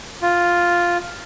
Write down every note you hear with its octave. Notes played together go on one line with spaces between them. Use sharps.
F4